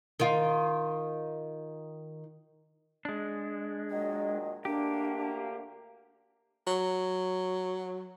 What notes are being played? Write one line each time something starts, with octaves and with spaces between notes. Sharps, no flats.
D#3 F4
G#3 D4
A#2 D#3 F#3 D#5
D2 A#3 D4 G4
F#3